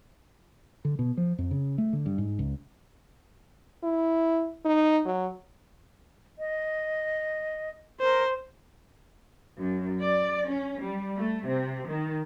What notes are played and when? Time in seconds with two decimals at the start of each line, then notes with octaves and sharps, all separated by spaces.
0.85 D3
0.99 B2
1.17 F3
1.38 F2
1.51 C#3
1.78 A3
1.93 D3
2.06 G2
2.18 G#2
2.39 C#2
3.83 E4
4.65 D#4
5.05 F#3
6.38 D#5
8.00 A#4 C5
9.58 F#2
10.01 D5
10.49 C#4
10.80 G3
11.17 A3
11.47 C3
11.88 D#3